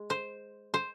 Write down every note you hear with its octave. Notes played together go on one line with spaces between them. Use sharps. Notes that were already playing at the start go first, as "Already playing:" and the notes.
Already playing: G#3
C5
C5